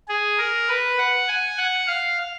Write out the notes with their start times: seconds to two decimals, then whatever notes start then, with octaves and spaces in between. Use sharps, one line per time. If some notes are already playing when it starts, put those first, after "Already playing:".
0.09 G#4
0.38 A#4
0.68 B4
0.98 F#5
1.29 G#5
1.57 F#5
1.87 F5